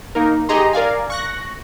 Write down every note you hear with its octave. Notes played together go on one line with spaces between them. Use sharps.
A#3 D#4 A#4
D#4 G4 G#4 D#5 A#5 C6
A#4 D5 F5 G#5
C#6 F#6 A#6